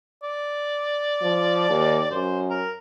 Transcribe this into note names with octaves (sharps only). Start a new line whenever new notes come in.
D5
F3
D#2
F#2 C5
A#4